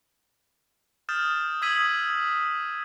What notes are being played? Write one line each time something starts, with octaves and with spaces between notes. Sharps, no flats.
D#6 F6 G6 A6 E7
D#6 E6 G#6 B6 D#7 F#7